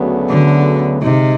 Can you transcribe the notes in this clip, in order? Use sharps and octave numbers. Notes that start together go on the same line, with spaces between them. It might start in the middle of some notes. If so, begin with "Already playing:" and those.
Already playing: D2 C#3 F#3 B3
D3
C3 G#3 C4 D#4